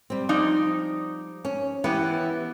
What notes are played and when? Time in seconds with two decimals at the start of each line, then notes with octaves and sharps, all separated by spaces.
0.10 G3 C4
0.29 F3 D#4 D5
1.45 C#4
1.84 E3 B3 G4